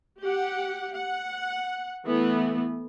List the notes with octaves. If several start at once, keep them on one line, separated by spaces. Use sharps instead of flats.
G4 F#5
F#5
E3 A3 B3